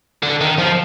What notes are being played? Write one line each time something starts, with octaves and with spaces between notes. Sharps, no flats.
D3
D#3
F3